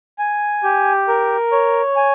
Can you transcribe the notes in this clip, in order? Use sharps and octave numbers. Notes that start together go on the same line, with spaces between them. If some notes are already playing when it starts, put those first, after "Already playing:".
G#5
G4
A#4
C#5
G#5